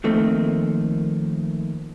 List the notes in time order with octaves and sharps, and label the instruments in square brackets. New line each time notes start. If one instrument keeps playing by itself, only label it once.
[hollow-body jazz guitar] D#3 F3 A3 A#3 C4